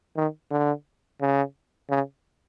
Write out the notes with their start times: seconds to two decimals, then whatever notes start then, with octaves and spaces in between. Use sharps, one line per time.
0.16 D#3
0.51 D3
1.21 C#3
1.90 C#3